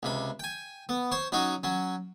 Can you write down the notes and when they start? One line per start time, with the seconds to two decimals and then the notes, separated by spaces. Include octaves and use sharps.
0.03 C#2 C3 B5
0.39 G5 G#5
0.89 B3
1.12 C5 C#5 C6
1.32 F#3 C#4 D#4 F#4
1.63 F#3 C#4